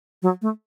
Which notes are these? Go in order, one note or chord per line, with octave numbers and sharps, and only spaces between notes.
F#3
A3